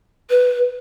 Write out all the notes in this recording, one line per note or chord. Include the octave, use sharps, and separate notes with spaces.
B4